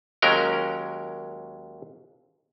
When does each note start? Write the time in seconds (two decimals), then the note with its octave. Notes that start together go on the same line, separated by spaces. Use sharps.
0.22 D#2 F#3 G#3 C#4 A#4 G5